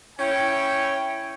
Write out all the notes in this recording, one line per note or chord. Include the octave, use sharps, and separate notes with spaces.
C#4 E4 C#5 G5